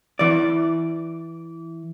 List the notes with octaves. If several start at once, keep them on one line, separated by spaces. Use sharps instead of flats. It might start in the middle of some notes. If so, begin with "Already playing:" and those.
E3 D5